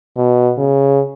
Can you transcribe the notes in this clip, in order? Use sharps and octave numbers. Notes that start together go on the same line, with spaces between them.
B2
C#3